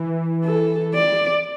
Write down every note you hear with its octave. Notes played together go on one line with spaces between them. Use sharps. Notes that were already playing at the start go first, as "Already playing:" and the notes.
Already playing: E3
A4
D5